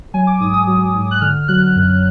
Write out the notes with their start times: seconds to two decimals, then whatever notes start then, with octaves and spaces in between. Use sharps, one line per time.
0.14 F#3 G#5
0.27 D6
0.40 G#2 D#6
0.54 D#6
0.67 F#3
0.95 G#2
1.11 F#6
1.21 D3 F6
1.48 F#3 F#6
1.76 F#2